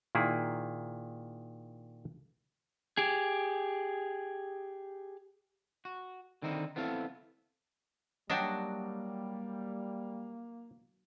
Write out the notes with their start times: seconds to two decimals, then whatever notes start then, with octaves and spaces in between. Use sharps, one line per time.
0.15 A#2 D#3 E4 G#4
2.97 G4 G#4
5.85 F#4
6.42 D3 D#3 C4 D#4 E4
6.76 B3 C4 E4 A4 F5
8.30 F#3 G3 A#3 D4 D#5 F#5 G5